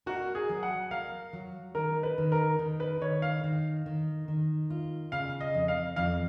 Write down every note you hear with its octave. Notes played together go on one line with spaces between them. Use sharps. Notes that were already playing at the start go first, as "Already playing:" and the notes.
F#4 A#4
G#4
F#3
F#5
A#4 F5
F#3
D#3 A#4
B4
D#3
A#4
D#3
B4
D#3 C#5
F5
D#3
D#3
D#3
F4
C#3 F5
D#5
F2
F5
F2 F5